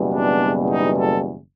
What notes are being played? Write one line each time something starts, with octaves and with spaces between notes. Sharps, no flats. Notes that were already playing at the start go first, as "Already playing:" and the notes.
Already playing: F#1 E2 B2 G3
D4
D#4
A4